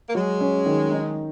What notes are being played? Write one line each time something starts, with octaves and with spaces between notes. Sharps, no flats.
A#3
F#3 G#3
C#4
D#3
D#4